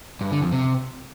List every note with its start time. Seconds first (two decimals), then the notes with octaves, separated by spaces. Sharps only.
0.21 G2
0.31 D3
0.42 F2
0.52 C3